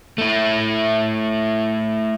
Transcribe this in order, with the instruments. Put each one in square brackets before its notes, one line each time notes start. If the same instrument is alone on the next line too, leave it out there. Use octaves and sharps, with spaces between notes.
[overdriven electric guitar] A3 E4